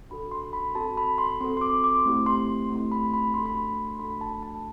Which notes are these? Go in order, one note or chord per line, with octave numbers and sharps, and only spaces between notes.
D4 F#4 A4 B5
C6
B5
C4 F#4 A4 A5
B5
C6
C4 F#4 A4 C6
C6
D6
D6
A3 C4 E4 G4
C6
A3 C4 E4 G4 C6
B5
B5
A3 D4 F#4 A4 C6
B5
C6
A3 D4 F#4 A4 B5
A5
A5